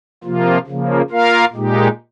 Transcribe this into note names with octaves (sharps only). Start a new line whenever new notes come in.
C3 F3 A#3 F4
C#3 F3 A#3
A#3 F4 A#4 F5
A#2 G#3 D#4 G4